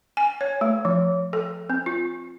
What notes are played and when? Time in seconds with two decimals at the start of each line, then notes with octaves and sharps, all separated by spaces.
0.17 G#5
0.41 C#5
0.61 A3
0.85 F3
1.33 A4
1.70 C4
1.86 F4